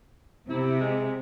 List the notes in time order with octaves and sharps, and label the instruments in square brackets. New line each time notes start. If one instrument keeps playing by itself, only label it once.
[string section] C3 [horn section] E4
[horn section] G#3